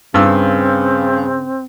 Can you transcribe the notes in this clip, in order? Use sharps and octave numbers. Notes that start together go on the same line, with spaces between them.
G2 C#3 C4 E6